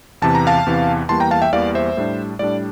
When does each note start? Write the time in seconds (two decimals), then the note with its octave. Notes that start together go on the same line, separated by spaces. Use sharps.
0.22 E2 C3 E3 A5
0.35 A#5
0.47 F5 A5
0.66 E2 C3 E3
1.09 E2 E3 G3 A#3 A5 C6
1.20 G5 A#5
1.31 F5 A5
1.42 E5 G5
1.53 E2 E3 G3 A#3 D5 F5
1.75 C5 E5
1.97 A2 G3 D4
2.39 A2 G3 D4 D5